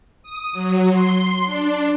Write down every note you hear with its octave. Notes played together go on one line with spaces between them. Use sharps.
D#6
F#3
C6
D4